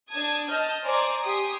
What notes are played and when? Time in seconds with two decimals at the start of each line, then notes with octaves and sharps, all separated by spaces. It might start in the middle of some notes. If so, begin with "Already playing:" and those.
0.10 D4 A5 D#6 G#6
0.48 D#5 A5 F6 G6
0.83 C5 D5 G#5 A#5 D6
1.24 G4 G#5 C6 D#6